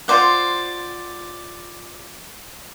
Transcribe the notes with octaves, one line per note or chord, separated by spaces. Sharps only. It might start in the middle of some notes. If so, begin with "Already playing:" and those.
F4 C5 D5 F#5